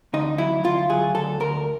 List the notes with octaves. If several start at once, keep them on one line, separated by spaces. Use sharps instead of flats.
D2 D#4
F#3 E4
D2 F4
F#3 G#4
D2 A4
D2 A#4